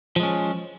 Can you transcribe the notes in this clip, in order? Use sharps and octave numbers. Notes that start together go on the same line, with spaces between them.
F3 G#3 C#4